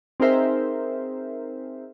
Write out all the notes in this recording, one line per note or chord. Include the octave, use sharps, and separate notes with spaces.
C4 D#4 G#4 A#4 C5 E5